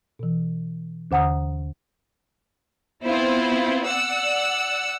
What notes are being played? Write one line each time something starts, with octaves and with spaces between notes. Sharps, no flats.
B2 E3
D#2 D3 F#5 A#5 D#6
B3 C4 E4 F4 C5
D5 F#5 E6